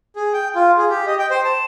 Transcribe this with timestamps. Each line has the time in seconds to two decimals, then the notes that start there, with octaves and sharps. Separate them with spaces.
0.16 G#4
0.33 G5
0.56 F4
0.77 G#4
0.90 G4
1.07 D#5
1.19 G5
1.31 C5
1.44 A5